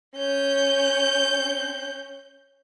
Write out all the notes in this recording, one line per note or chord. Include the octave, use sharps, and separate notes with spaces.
C#4 G6